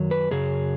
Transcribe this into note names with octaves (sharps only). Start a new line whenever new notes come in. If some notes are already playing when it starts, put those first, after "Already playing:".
Already playing: F#2 D#3 F#3
B4
F#2 C#3 F#3 G#4